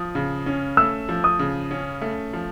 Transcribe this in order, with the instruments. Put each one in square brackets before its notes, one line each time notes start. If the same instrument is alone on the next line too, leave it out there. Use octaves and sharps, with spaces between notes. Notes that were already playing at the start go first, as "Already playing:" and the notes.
Already playing: [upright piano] F3 [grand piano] D#6
[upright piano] C#3
C#4
[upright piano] A3 [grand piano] E6
[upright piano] F3
[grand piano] D#6
[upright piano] C#3
C#4
A3
F3